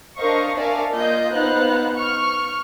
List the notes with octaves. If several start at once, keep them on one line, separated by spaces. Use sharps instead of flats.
D4 A#4 C5 D#5 F5 C#6
A#4 D5 E5 F5 G#5 A5
A#3 F4 D#5 G6
B3 D#4 C5 F5 F#6
C#6 F6